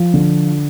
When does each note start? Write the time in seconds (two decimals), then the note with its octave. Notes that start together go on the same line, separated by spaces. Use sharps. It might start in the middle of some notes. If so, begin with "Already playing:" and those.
Already playing: F3
0.14 D3